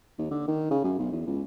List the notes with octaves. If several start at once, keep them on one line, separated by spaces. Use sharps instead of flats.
D#2
D3
D#3
C#3
F#2
B1
E2
C#2